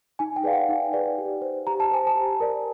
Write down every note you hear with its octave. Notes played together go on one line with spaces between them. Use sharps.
D#4 G#5
G5
G#4 B4 D5 F5
F#5
D#4
G#4 B4 D5
G4
C5
G4 A#5
A5
C5 G#5
A5
G4
A#4 D5